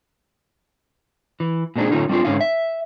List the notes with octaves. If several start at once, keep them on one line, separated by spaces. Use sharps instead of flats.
E3
A#2 G#3 C4 D4 D#4 G#4
A2 D3 A3 C#4 D#4 F4
G3 C4 D4 E4 F4
G#2 D3 G#3 C#4 D#4 F5
E5